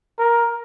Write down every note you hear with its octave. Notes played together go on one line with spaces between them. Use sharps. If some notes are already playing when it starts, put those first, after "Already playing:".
A#4